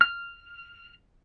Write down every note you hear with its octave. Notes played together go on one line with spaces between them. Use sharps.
F6